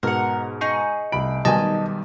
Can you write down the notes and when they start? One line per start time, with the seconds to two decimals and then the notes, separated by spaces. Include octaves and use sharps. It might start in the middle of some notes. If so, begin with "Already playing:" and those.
0.03 G#2 B2 A#4 F#5
0.61 D#4 G#4 C#6
1.12 C2 B5 D7
1.45 B1 D#3 G3 G4 D#5 G#5 A5